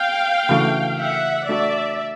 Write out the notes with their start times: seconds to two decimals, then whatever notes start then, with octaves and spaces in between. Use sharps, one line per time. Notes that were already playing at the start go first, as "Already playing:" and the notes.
Already playing: F5 G5
0.49 C#3 E3 A3 D4 F#4
1.00 E5 F#5
1.49 A3 D4 F#4 D5 E5